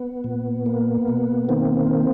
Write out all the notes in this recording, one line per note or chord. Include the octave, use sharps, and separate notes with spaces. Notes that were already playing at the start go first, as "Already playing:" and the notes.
Already playing: B3
A#2
A#3
B2
D#3 A#3 C4